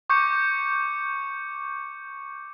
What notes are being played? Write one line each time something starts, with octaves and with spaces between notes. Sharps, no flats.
C#6 D6 G6 C#7